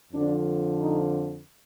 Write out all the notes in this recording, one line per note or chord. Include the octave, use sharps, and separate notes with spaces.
F2 D3 F3 D4
D#4